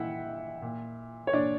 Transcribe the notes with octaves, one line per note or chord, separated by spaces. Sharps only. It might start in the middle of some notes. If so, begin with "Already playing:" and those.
Already playing: A#2 E4 E5 F#5 G5
A#2
C#5
A#2 D4 D5